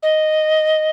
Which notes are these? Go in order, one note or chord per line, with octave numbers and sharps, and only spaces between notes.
D#5